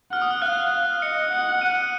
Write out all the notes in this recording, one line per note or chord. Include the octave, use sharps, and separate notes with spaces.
F#5 F6
D#6
F6
F5 F#6
F5
D#5 C#7
F#5 C#7
F#5 D#7